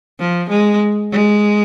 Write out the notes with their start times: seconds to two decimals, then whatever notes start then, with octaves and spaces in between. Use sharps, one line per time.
0.19 F3
0.50 G#3
1.12 G#3